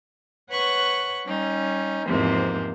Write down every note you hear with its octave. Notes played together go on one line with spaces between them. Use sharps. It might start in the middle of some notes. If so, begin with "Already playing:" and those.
B4 C#5 F#5 C#6 F#6
G3 C#4 D#4
E2 G#2 C3 F3 A#3 C4